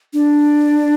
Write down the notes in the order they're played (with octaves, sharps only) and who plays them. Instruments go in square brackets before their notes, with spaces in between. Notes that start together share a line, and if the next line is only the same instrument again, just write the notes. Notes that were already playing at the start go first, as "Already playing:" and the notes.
[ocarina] D4